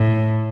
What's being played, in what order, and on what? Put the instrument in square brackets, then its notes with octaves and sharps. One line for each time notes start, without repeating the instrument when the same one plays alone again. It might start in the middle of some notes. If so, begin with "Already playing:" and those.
Already playing: [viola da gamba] A2